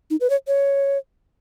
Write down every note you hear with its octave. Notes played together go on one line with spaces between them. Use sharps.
D#4
B4
C#5
C#5